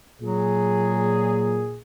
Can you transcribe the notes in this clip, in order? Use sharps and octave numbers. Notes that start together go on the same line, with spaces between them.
A#2 F#3 G#4